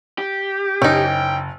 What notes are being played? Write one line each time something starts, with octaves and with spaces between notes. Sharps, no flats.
G4
F#1 C#4 D#4 G5